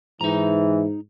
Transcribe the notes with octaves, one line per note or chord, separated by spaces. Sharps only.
G#2 E3 D#4 A#5